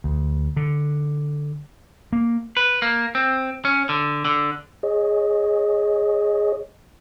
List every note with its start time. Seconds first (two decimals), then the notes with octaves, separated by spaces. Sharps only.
0.04 D2
0.57 D3
2.13 A#3
2.57 B4
2.82 A#3
3.15 C4
3.65 C#4
3.89 D3
4.25 D3
4.83 G#4 C#5 D#5